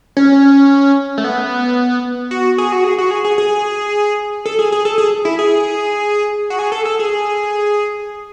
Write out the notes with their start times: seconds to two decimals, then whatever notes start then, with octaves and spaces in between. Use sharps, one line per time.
0.17 C#4
1.18 A3
1.24 B3
2.31 F#4
2.58 G#4
2.72 F#4
2.84 G#4
2.98 F#4
3.11 G#4
3.25 G#4
3.38 G#4
4.46 A4
4.59 G#4
4.72 G#4
4.85 A4
4.98 G#4
5.25 E4
5.39 G#4
6.50 F#4
6.59 G#4
6.72 A4
6.85 A4
6.99 G#4